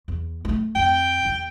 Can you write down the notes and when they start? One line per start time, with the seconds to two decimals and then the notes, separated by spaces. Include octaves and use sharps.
0.08 E2
0.45 G#3 A3
0.75 F2 G5
1.25 E2